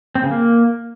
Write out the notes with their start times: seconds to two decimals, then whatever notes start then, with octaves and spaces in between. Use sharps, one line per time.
0.15 C4
0.23 C#3
0.31 A#3